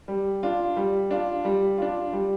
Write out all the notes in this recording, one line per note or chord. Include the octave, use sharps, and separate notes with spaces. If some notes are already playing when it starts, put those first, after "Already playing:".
G3
D4 F4
G3
D4 F4
G3
D4 F4
G3